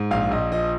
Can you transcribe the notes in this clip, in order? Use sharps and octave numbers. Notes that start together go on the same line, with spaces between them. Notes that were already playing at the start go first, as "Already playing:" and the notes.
Already playing: G#2
A#1 F5
A#1 D#5
F3 D#5